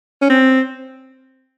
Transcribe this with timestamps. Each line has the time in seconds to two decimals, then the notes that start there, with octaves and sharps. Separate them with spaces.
0.22 C#4
0.30 C4